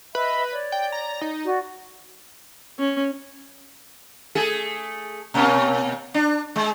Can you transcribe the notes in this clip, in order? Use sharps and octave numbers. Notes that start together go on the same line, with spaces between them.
B4 D#5 E5 B5
C#5 D5
G5
A#5
D#4
F#4 D5
C#4
A3 G#4 A4
B2 A#3 C#4
D4
G#3